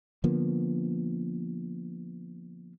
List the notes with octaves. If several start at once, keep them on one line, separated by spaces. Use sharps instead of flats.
D3 F3 A#3 B3